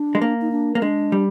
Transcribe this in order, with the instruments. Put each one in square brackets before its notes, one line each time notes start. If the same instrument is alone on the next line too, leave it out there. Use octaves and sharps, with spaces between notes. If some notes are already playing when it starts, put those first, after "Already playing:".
Already playing: [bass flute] D4
[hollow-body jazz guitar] G#3
A#3
[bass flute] D#4
D4
[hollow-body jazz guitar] A#3
[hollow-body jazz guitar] G#3 [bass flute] D4
[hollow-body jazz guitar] G3